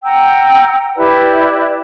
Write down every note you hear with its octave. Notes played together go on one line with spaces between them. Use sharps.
F#5 G5 A#5 E6
E4 G4 B4 D5